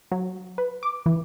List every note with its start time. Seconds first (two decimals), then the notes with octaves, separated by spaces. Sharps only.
0.12 F#3
0.58 B4
0.83 D6
1.06 E3